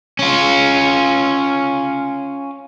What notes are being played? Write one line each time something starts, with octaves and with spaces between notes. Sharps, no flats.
C#4 F4